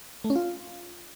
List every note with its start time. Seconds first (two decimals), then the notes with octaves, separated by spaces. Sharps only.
0.24 A3
0.30 C#4
0.35 F4